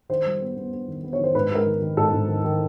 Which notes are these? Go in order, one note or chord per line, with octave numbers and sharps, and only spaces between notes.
D#3 C5
G3
B3
B3
B3
D#3
B3
C#5
D#3 C5
G#2 B4
G#3 A#4
D#3
D#3
G#2 A4
G#2
D#3
D#3